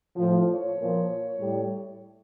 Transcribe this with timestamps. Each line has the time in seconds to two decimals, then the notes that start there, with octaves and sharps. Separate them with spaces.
0.16 A2 F3
0.47 C#5
0.77 A#2 F3
1.38 A2 G3